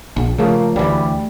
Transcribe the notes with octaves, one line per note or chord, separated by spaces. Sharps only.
A#1
C#3 F3 A3 A#3
D2 E3 G3